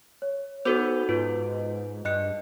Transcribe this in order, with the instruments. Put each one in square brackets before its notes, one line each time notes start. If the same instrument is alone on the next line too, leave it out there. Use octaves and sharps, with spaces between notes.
[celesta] C#5
[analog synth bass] B3 [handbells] D#4 A4 C5 [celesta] F#4 D6 G6
[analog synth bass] G#2 [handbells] F4 [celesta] B4
[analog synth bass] G2 [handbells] D#5 F#6 C#7